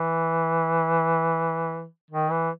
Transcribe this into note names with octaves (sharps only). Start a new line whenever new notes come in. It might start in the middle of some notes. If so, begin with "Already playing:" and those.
Already playing: E3
D#3
E3